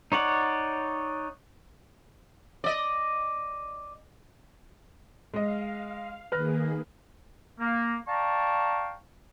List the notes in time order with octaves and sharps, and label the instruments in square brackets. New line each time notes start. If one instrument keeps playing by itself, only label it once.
[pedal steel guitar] D#4 C#5 D5 F#5
[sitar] D5 D#5
[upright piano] G#3 D#5 [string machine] F5
[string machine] D#3 A#3 G#4 [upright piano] B4 F6 A#6
[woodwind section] A#3
D5 F5 G5 A5 A#5 C#6